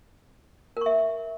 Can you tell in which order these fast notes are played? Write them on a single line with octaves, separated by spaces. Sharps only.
A#4 C#6 E5